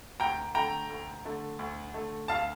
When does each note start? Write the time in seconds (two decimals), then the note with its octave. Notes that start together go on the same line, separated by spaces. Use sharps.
0.20 D2 G5 A#5
0.55 D3 A3 G5 A#5
0.90 D2
1.25 D3 A3
1.59 D2
1.94 D3 A3
2.28 D2 F5 A5